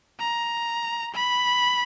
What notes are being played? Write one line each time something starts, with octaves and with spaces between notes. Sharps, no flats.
A#5
B5